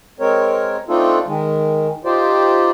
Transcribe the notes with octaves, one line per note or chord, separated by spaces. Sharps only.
G#3 C4 A#4 C#5
A3 C4 D4 D#4 F4 A4
D#3 G#3
D#4 F4 G4 C5 D5